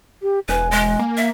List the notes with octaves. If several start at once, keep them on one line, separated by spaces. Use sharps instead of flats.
G4
E1 B4 G#5
G#3
A#3
E5